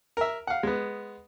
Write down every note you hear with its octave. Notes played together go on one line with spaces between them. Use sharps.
A#4 E5
F5 F#5
G#3 B3